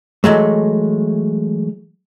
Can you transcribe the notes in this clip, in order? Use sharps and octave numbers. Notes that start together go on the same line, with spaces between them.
E3 F#3 G#3 A3